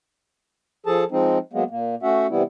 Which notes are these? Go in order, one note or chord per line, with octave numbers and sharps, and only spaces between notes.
F3 G#4 A4 A5
F3 G#3 C4 D#4
F#3 G#3 A#3 B3
A#2 A#3
A3 C#4 F#4 E5 F#5
C3 E3 G3 B3 E4